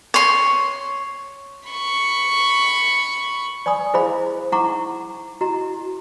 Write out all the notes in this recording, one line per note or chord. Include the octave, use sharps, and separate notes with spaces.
C#5 C6
B5 C#6
D5 G#5 B5 D#6
E4 G#4 C5 D#5 F5 B5
D#4 E4 F#5 A#5 C#6 D6
E4 F#4 D#5 A#5